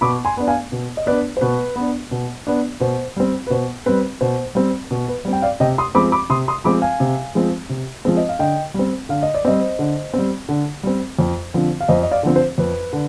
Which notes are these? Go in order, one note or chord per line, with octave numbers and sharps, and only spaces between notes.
B2 B5 D6
G#5 C6
B3 D4
F5 G#5
B2
D#5
B3 D4 B4 D5
C5
B2 B4
B3 D4
B2
B3 D4
B2 C5
G3 C4
B4
B2 C5
G3 C4 B4
B2 C5
G3 C4
B2
B4
G3 C4
G5
D5 F5
C3 D#5 G5
C6 D#6
F3 G#3 C4 B5 D6
B5 D6
C3 C6 D#6
C6 D#6
F3 G#3 C4 B5 D6
F5 G#5
C3
F3 G#3 C4
C3
F3 G#3 C4
D#5
F5
D3 D#5 G5
G3 C4
D3 F5
D#5
D5
G3 C4 C5 D#5
D3
G3 C4
D3
G3 C4
F2
D3 F3 C4
F5
F2 C5 D#5
D#5
D5 F5
D3 F3 C4
C5
F2 B4
D3